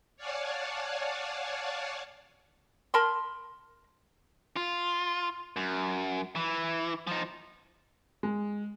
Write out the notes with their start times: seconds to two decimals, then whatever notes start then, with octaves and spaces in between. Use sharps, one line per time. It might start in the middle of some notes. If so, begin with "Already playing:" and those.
0.17 C#5 D5 F5 F#5 G#5 A5
2.94 A#4 A5 B5 C6
4.56 F4
5.56 F#2
6.36 E3
7.07 F3 D#4
8.23 G#3